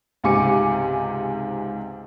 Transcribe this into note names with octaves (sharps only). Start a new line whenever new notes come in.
C#2 G#2 C3 G#5 D6 C#7